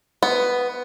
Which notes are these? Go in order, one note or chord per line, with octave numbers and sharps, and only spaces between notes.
B3